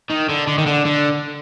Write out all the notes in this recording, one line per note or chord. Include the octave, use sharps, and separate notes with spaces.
D#3
D3
D3
D#3
D3
D3